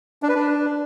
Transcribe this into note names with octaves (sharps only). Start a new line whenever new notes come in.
D4
B4
D4